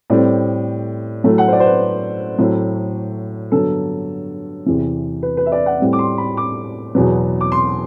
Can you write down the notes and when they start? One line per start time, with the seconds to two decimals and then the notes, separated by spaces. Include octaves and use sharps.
0.10 A2 G3 C4 D5
1.24 A2 F#3 A3
1.38 F#5
1.48 C5
1.53 D5
1.60 C5
1.66 B4
2.38 A2 F#3 A3 C4
3.52 G2 D3 F#3 B3 A4
4.66 E2 C3 E3
5.23 B4
5.37 B4
5.46 E5
5.52 D5
5.66 F#5
5.80 A2 G3 C4
5.93 D6
5.99 C6
6.18 B5
6.37 D6
6.95 E2 B2 F#3 B3
7.41 D6
7.52 C6